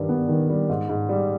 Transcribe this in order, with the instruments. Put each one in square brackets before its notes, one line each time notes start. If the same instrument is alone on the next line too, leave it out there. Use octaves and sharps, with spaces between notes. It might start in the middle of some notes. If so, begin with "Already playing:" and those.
Already playing: [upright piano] G2 D#3 G3
B3
D#3
G3
G#2
G#2
G3